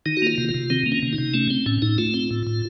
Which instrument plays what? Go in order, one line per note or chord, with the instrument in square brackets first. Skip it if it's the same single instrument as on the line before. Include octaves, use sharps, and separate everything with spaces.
[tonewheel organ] D#3 D#4
F#4
A#3 F4
C3
F4
C3
D#3 C4
A#3
C#4
C3
D#4
C3
A3 C#4
C4
A2 C#4
A2 D#4
A3 F4
C4
A2
A2